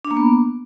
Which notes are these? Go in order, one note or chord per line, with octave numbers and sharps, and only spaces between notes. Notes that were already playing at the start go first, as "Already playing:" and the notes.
D4
A#3
B3